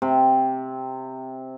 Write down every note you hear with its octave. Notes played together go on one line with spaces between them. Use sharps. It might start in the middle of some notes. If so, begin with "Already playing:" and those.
C3